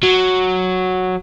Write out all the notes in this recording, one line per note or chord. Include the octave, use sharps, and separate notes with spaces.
F#3